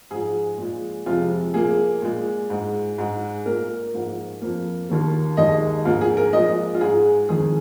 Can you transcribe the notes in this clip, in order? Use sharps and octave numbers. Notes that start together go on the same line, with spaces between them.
G#2 F3 G#3 G#4
A#2 F3 G#3
F2 C3 F3 G#3 F4
A#2 F3 A#3 G#4
A#2 G#3
G#2 G#3
G#2 G#3
A#2 A#3 A#4
G#2 F3 A#3
F2 F3 A#3
D#2 D#3 A#3
D#2 D#3 G#3 D#5
G#2 F3 A#3 F4
G#4
A#4
A#2 F3 G#3 D#5
F4
G#2 G#3 G#4
F2 D#3 G#3 G#4